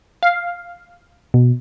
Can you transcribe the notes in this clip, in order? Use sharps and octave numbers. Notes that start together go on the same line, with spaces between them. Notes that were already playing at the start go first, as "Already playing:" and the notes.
F5
B2